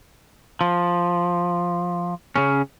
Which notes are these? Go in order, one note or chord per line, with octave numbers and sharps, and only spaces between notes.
F3
C#3 C#4